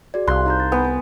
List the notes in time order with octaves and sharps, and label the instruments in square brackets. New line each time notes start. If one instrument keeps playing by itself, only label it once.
[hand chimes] F#4 G#4 D5
[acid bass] C2 [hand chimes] F5 F#6 [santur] C6
[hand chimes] D#4 A#5 G6
A6
[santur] B3 [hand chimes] G#5
[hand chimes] G#5